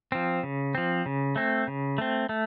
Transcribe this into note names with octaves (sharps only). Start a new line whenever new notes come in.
F3 C4
C#3
F3 C4
C#3
A3 C4
C#3
A3 C4
A3